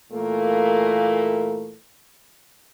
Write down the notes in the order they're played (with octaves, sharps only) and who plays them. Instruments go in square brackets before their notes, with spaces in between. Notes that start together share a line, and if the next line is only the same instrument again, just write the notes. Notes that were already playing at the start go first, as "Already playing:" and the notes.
[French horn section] A#2 E3 A3 A#3